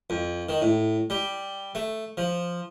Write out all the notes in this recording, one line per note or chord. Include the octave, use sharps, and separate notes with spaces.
F2
D#3
A2
G3
A3
F3